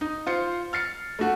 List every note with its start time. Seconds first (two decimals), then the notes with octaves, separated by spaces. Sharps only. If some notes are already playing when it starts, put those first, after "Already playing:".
0.01 D#4
0.27 F4 C5 C#7
0.73 F6 A6 C7 C#7
1.19 A3 F#4